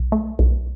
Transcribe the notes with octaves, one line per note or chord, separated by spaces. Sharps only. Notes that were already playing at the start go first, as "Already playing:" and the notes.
Already playing: B1
A3
B1